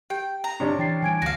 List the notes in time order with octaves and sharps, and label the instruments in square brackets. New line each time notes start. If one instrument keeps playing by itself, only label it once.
[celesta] G4 [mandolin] G5
[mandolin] A#5
[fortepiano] C3 C#4 D4
[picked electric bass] E3 [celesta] G5 A6 C7
[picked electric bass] E3 G3 [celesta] G#5 G#6 D7
[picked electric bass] D2 D3 [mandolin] F#4 F5 [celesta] A#6